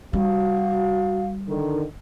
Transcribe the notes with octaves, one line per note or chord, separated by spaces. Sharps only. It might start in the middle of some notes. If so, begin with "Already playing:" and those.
G3 F#4 F5
D3 D#3